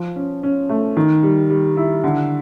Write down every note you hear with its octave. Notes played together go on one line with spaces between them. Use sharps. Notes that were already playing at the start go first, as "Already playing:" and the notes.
Already playing: F3
C#4
C#4
A3
D#3
G3
G3
E4
D3